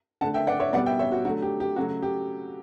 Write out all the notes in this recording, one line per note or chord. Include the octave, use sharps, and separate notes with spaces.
D3 A3 F#5 A5
E5 G5
D5 F#5
C#5 E5
B2 G3 B3 D5 F#5
E5 G5
C#5 E5
F#4
D3 F#3 A3 F#4
G4
G4
C#3 F#3 A3 F#4
G4